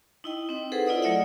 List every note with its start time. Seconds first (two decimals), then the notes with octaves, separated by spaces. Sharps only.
0.24 D#4 E4 D#5 G5
0.49 C4 D#4
0.72 G#4 A4 B4 C5 F#5
0.86 E4 F4 D5 D#5 F#5 D#6
1.02 F#3 A3 D5 E5 F#5